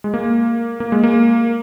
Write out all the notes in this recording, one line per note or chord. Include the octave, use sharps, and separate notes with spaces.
G#3
A#3
A#3
G#3
A#3